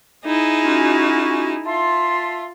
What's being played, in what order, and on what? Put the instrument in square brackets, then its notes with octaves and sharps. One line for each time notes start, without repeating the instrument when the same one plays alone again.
[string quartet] D#4 E4 G#4
[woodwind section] C#4 F4 F#4
[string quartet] F4 [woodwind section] E5 A5 C6